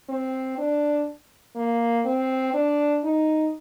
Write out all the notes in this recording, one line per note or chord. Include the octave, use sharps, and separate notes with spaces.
C4
D4
A#3
C4
D4
D#4